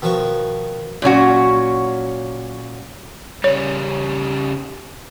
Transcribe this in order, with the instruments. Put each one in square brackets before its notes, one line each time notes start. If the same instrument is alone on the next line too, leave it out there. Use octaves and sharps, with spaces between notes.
[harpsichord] B2 D#3 F3 F#4 C#6
[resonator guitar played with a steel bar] A#2 F#3 C#4 F#4
[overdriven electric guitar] C#3 G3 [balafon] C#5